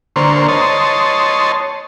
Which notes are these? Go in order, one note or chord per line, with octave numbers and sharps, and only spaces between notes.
D3 A#3 C5 C#6
C#5 D#5 A5 C6